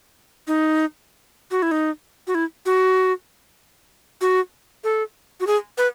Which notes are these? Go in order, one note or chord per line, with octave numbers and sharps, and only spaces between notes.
D#4
F#4
E4
D#4
F#4
E4
F#4
F#4
A4
F#4
G#4
B4